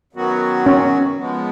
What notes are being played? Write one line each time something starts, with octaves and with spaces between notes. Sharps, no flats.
F#2 D#3 F#3 B3 F#4
C#4
F3 G#3 B3